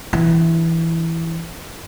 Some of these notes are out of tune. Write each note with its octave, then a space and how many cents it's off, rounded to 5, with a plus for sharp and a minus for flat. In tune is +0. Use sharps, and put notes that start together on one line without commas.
E3 +0 D4 +0